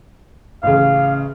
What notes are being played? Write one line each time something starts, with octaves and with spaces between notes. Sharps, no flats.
A1 C#3 F5